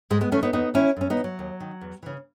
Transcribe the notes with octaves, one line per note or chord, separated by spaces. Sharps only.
G#2 G#3
G#3 B3
E3 A3 C#4
B3 D#4
E2 B3 D#4
D#3 C#4 E4
F#2 C#4
B3 D#4
E3
F#3
D#2
D#3
E2
C#3 E3